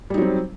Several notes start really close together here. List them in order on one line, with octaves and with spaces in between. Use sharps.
G3 D#4 F#3 C4